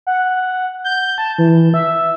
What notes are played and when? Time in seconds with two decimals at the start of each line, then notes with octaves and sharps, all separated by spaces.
0.07 F#5
0.84 G6
1.18 A5
1.38 E3
1.74 E5